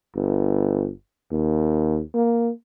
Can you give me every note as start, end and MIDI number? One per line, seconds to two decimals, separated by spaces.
0.14 0.91 31
1.31 2.01 39
2.14 2.51 58